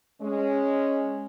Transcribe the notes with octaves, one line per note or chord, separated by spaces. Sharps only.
G#3 C#4